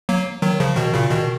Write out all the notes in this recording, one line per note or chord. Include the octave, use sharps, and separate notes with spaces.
F#3 A#3
D#3 F#3
C#3 F3
B2 D#3
A#2 C#3
B2 D#3